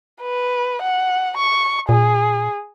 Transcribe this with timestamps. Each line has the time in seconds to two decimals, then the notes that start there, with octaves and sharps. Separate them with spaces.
0.22 B4
0.82 F#5
1.37 C#6
1.89 A#2 G#4